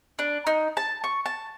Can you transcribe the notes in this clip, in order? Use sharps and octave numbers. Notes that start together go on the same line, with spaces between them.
D4
D#4
A5
C#6
A5